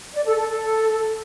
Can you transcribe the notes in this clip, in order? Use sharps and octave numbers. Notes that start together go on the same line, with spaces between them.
D5
A4
A4
A4